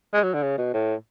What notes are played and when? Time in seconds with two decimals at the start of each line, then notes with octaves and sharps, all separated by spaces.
0.13 G#3
0.23 F#3
0.34 D3
0.43 C#3
0.58 B2
0.73 A2